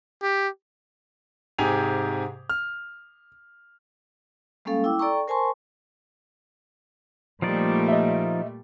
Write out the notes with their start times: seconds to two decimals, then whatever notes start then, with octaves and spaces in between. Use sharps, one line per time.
0.22 G4
1.58 G#2 C3 G4 G#4 G#5 F7
2.50 F6
4.65 G3 G#3 A#3 C#4 A4 F5
4.84 E4 G5 D6 E6
4.99 A4 D5 G5 A#5 C#6
5.28 A#4 C5 G#5 A5 C6 C#6
7.42 A#2 F3 G3 A3 D#4 D5
7.89 D#5 E5